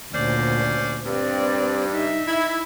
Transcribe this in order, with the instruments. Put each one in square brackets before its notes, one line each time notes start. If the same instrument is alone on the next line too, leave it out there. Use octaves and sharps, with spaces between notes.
[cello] D2 A#2 [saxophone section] C#4 C5 D5
[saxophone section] G2 [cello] C4 D5
[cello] D#4 E5
[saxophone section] E4